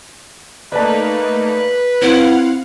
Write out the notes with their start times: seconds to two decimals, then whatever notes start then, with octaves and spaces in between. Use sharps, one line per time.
0.72 A3 A#3 D#4 B4 D5 A5
2.02 C4 E4 C5 F5 F#5